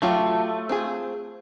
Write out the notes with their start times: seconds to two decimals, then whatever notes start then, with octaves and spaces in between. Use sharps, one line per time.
0.02 F#3 A3 F4 G4
0.69 C4 F4 G#4